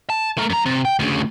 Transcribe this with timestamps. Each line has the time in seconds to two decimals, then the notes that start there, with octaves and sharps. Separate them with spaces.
0.10 A5
0.38 A3 A#4
0.50 F#2 A#5
0.66 C3
0.85 G5
0.99 D2 C#3